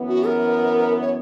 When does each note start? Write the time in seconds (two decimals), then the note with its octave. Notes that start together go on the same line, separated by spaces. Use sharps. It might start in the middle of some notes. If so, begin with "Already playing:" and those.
Already playing: F#2 E3 B3
0.08 F#4
0.26 A#4
1.01 C#5